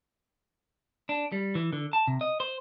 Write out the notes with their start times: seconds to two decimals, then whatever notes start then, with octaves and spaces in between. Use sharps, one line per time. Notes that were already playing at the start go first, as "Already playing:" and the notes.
1.09 D4
1.32 G3
1.55 E3
1.73 D3
1.93 A5
2.08 C3
2.21 D#5
2.40 C5